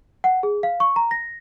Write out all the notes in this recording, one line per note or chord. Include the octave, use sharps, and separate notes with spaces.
F#5
G#4
F5
C#6
A#5
A#6